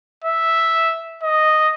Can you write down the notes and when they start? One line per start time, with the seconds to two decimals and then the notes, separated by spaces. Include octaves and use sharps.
0.24 E5
1.23 D#5